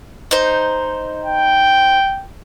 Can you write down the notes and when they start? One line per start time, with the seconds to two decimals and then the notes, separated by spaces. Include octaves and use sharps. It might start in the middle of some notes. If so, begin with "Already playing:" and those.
0.31 D#4 C5
1.24 G5